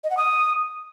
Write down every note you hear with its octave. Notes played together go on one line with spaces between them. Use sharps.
D#5
F#5
D#6